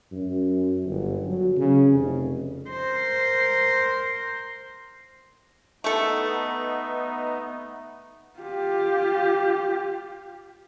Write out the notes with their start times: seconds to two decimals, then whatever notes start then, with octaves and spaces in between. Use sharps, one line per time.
0.12 F#2
0.85 G1
1.26 F#3
1.57 C#3
1.92 F1
2.70 A#4 C5
5.84 A3 B3 D#4 A4
8.39 F4 G4